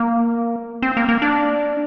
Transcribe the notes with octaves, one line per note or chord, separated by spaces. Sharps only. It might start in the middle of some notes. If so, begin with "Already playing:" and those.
Already playing: A#3
C4
A#3
A#3
D4